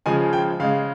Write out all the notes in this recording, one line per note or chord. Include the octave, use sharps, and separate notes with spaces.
C#3 F3 G#3 G#5
G5
C#3 G#3 F5